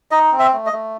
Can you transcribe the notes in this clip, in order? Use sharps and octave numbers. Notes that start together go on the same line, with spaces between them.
D#4 D#5
C4
E5
A3
D#5
A3